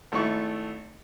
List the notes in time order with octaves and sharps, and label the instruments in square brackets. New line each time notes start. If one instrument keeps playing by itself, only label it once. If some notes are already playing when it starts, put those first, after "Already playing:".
[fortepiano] G#1 A3 E4 C#6